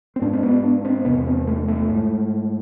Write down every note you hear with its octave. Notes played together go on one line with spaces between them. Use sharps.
C4
G#2 D4
C4
B3
D4
C4
E2 C3 B3
C4
A3
B3
A3
G#2